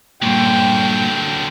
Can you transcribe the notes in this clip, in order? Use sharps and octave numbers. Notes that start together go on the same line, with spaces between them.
G2 A#2 D3 F#3 G5